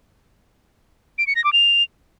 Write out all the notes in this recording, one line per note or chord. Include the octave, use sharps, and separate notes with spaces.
D7
C#7
A#6
D6
F7